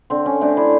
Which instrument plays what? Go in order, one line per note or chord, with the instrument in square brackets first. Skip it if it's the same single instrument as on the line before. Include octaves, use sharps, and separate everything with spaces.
[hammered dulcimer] D3 C4
C#4
A3 C4 D4
D4 E4